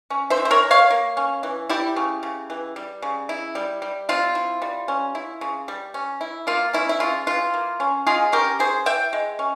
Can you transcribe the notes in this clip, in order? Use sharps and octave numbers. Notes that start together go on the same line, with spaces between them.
C#4
C5 E5
E3
C5
A#4 C#5
E3
C#5 F5
A#3
C#4
E3
G3 E4 G4
C#3
C#3
E3
G3
C#3
E4
G3
G3
C4 F4
E4
G3
C#4
E4
C#3
G3
C#4
E4
A#3 F4
C#4 E4
E4
C#3 F4
E3 F4
A#3
C#4
G#3 F4 G#4
C#4 G4 A#4
C#3 G#4 C5
E3 E5 G5
G#3
C#4